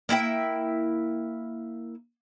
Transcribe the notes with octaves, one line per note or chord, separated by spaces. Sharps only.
A#3 E4 E5 G5